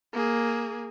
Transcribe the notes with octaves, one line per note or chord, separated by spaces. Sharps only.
A#3 G#4